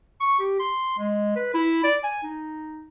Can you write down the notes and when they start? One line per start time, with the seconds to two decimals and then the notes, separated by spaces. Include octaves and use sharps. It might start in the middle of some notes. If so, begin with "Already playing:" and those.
0.20 C#6
0.39 G4
0.60 C6
0.98 G#3
1.36 B4
1.54 E4
1.84 D5
2.03 G#5
2.23 D#4